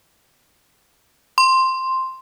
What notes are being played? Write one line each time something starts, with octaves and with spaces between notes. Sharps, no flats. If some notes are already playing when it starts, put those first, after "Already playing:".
C6